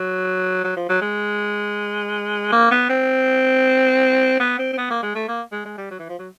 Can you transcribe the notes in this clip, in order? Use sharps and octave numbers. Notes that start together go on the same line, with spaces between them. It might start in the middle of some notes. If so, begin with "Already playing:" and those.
Already playing: F#3
F#3
F3
F#3
G#3
A#3
B3
C4
B3
C4
C4
B3
A#3
G#3
A3
A#3
G#3
G#3
G3
F#3
E3
F3
F#3